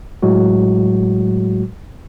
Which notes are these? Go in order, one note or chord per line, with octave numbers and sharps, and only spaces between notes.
A2 F#3 G#3 F#4